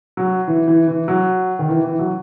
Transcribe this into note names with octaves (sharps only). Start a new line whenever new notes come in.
F#3
E3
E3
E3
F#3
D#3
E3
E3
F#3